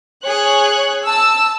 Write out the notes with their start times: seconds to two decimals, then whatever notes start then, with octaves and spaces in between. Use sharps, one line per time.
0.25 G#4 C#5 F#6
1.04 A5 E6